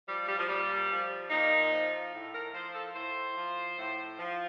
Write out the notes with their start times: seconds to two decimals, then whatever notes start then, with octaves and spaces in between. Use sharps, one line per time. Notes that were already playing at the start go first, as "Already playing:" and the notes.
0.08 F3 G3
0.28 G3
0.39 F3
0.48 A#2 G3
0.91 F3
1.31 A#2 D#4
1.72 F3
2.13 A2
2.34 A#4
2.54 F3 C5
2.74 A4
2.95 A2 C5
3.36 F3
3.78 A2
4.19 F3